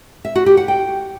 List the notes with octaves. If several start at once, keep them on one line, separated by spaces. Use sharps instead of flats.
E5
F#4
G4
F#5
G5